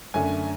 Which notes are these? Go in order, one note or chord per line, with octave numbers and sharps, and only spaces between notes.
F#2 D3 A3 D4 G#5